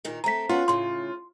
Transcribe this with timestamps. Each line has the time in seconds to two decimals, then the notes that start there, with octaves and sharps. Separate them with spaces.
0.05 A#2 D#3 D#4
0.24 A3 C4 A#5 B6
0.49 B3 C#4 F4 F#4
0.68 A2 C#3 C6